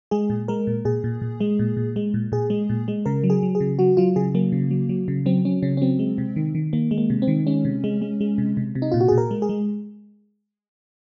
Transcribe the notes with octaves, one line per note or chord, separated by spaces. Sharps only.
G#3 G#4
A#2
G#3 A#4
A#2
A#2 G#4
A#2
A#2
G#3
A#2
A#2
G#3
A#2
A#2 G#4
G#3
A#2
G#3
C#3 A#4
F#3
G#4
F#3
G#4
C#3
F#3 F#4
F#3 F4
C#3 G#4
F#3 A#3
C#3
F#3
F#3
C#3
F#3 C4
F#3 C#4
C#3 C#4
C#4
F#3 C4
G#3
C3
D#3
D#3
D#3 A#3
G#3
A#3
C3
C4
D#3
G#3 C#4
C3
G#3
G#3
G#3
C3
C3
C3
D#4
A#2 F4
F#4
A#2 G#4
A#4
G#3
G#4
G#3